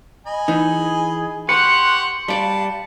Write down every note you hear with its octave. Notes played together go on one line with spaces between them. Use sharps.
D#5 G#5 B5
E3 D#4
G#4
G4 B4 F#5 C6 C#6 C#7
G3 D5 F5 A5